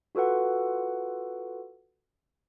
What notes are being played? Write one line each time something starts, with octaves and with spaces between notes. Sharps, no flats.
F4 F#4 A4 B4 F#5